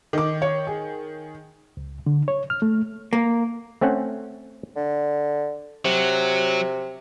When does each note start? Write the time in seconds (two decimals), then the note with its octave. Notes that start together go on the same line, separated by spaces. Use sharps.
0.13 D#3 D#5 D6
0.42 C#5
0.67 G#4
1.77 C#2
2.06 D3
2.28 C#5
2.50 F6
2.62 A3
3.13 A#3
3.81 A3 C4 C#4 F#5
4.76 D3
5.85 C3 F#3